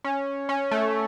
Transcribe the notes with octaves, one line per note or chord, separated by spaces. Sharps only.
C#4
C#4
A3